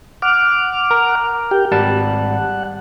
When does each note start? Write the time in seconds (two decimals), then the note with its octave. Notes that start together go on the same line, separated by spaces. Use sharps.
0.22 F#5 D6 F6
0.91 A#4
1.51 G4 G5
1.72 G#1 G3 F#5 A5